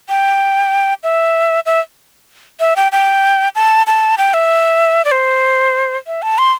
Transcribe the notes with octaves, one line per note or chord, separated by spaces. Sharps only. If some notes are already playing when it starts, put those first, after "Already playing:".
G5
E5
E5
E5
G5
G5
A5
A5
G5
E5
D5
C5
E5
A5
C6